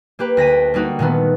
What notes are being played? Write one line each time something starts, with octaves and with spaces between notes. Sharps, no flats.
A#3 G4 B4
D2 A#6 B6 D#7
G3 A#3 D#4 F#4
A#2 D#3 A3 B3